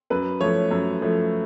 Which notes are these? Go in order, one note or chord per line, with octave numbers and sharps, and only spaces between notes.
F#2 B4
F3 A3 C#5
F#2
F3 A3